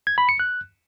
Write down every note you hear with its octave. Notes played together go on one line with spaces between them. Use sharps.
G#6
B5
C#7
F#6